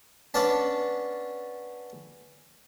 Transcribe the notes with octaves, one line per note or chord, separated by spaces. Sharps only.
B3 C#4 D4 A5